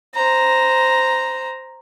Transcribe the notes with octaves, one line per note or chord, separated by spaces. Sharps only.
C5 A#5